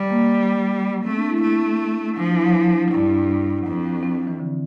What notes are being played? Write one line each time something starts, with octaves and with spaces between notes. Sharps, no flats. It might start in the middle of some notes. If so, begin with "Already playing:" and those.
Already playing: G3
A#3
A3 C4
D4
E4
A3 E4
F3 D4
E4
E4
D4
G2 E4
D4
F2
C4
C4
E3
D3